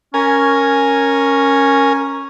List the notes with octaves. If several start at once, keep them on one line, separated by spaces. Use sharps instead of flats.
C#4 A#4 G#5